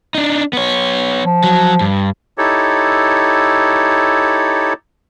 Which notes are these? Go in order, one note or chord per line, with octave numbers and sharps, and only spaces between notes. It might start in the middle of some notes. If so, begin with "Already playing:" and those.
D4 D#4
B3 C#5
F3
F#3
G2
D#4 E4 G4 A4 C#5